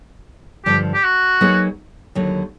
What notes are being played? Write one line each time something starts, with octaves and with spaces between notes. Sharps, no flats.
G2 D3 F3 G4
G4
F#4
F#3 A#3 D#4 G#4 B4
D#2 D3 F#3